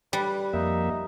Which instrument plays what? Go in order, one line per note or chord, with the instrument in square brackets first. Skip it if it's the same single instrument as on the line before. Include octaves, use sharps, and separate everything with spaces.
[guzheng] G3 [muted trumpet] B4
[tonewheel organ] F2 A#3 E5 [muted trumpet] D#4